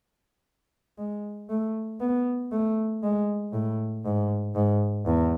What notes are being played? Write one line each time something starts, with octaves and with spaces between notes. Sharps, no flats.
G#3
A3
B3
A3
G#3
A2
G#2
G#2
E2